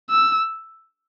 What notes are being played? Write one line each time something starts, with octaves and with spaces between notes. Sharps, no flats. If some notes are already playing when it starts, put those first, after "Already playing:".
E6